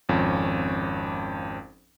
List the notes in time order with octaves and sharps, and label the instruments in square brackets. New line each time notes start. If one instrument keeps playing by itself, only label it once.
[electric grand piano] G#1 F2 C#4